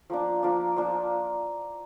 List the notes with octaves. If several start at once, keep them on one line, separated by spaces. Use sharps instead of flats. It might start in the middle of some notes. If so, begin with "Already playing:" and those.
F3 A#3 D4
F3 A#3 D4
F3 A#3 D4